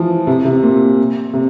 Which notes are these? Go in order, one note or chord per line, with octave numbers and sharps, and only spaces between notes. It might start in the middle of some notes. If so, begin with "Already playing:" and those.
Already playing: E3 F3
C3
C3
A#2
C3